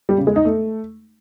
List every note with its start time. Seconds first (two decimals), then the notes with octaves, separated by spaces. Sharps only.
0.09 G3
0.18 C#3
0.27 G#3
0.36 D#4
0.45 A3